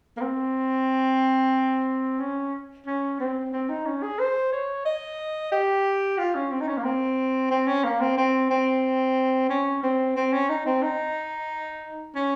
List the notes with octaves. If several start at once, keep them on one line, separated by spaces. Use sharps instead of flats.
A#3
C4
C#4
C#4
C4
C4
D#4
C#4
G#4
C5
C#5
D#5
G4
F4
C#4
C4
D#4
C#4
A#3
C4
C4
C#4
A#3
C4
C4
C4
C#4
C4
C4
C#4
D#4
C4
D#4
C#4